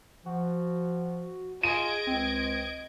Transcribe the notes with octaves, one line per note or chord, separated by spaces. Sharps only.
F3 F#4
F4 G#4 D#5 G#6 D7 D#7
C#2 C4